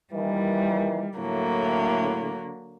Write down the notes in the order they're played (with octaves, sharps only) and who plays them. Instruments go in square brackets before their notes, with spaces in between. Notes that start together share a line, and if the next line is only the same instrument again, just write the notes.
[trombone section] A#2 D#3 E3 [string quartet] G3
[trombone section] A2 [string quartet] D3 F#3 A#3